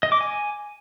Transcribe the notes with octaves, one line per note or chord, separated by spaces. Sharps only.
D#5
D6
G#5